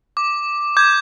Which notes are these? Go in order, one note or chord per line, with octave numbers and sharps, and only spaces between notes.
D6
D6 G6 G#6